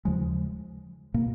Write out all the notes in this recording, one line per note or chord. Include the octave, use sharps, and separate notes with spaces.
D#2 C#3 F3 G#3
B2 A#3